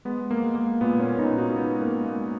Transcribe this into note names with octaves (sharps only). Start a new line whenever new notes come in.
G#3 B3
A#3
G#3
A#3
A#2 B3
A#3 C#4
A#2 B3 D#4
D#4 F#4
G#3 B3
A#3
G#3
A#3